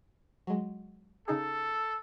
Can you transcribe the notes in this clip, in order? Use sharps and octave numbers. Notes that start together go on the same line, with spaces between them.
F#3 G#3
C#3 D#4 G#4 A4